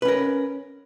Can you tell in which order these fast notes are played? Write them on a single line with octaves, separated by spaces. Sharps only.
B4 C#4 A#4